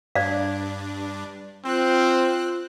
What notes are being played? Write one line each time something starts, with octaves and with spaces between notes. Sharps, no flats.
G2 D4 D5 F5
C4 F4 C5 F#6